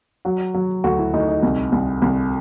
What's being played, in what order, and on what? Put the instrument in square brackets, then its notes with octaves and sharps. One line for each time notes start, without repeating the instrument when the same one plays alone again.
[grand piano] F#3 F#4
F#3
D2 F#4
E4
D2 D#4
D#4
C2
C2
C2